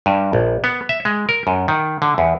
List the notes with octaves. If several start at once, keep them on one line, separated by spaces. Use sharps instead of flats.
G2
A#1
B3
E5
G#3
A#4
F#2
D#3
D3
E2